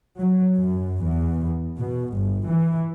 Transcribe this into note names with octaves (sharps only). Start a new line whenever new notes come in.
F#3
F#2
E2
B2
G1
E3